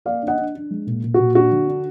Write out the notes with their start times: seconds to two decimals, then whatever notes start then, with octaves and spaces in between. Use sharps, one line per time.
0.05 A#3 D5 F5
0.22 D4
0.28 D#5 F#5
0.38 D4
0.55 D4
0.71 G#3
0.87 A#2
1.03 A#2
1.14 A#2 F#4
1.35 D4 F#4
1.52 D3
1.68 D4